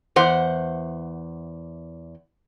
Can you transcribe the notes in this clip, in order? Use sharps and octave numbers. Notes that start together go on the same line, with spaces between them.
E2 C5 F#5